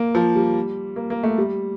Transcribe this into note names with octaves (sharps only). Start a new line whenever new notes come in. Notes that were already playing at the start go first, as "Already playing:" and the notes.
Already playing: A#3
F3
G3
A#3
A#3
A3
G3